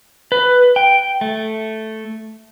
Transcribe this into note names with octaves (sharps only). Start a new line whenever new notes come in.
B4
G5
A3